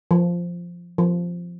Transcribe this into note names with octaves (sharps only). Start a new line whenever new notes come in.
F3
F3